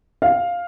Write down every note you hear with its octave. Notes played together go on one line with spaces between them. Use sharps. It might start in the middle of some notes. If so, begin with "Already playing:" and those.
F5